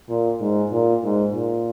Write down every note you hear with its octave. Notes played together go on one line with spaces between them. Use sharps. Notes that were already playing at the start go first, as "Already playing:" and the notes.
A#2
G#2
A#2
G#2
A#2